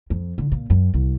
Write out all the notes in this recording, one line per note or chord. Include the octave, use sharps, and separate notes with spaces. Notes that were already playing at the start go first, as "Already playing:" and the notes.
F2
D3
A#2
F#2
C2